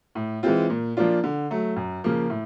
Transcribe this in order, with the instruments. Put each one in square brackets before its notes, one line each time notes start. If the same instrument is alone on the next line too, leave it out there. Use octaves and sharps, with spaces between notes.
[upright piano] A2
E3 G#3 C4 F4
A#2
F3 A#3 D4 F4
D3
F#3 A3
F#2
C#3 F3 A#3
A2